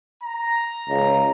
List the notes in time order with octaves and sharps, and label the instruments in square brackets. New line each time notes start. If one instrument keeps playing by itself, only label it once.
[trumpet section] A#5
[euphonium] C#2